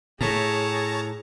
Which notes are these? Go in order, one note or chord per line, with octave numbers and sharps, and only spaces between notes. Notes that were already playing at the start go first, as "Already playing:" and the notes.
A2 G#4 C#5 A5 A#5